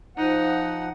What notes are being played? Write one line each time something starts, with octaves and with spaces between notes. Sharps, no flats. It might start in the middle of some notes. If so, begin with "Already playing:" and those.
F3 D#4 F#5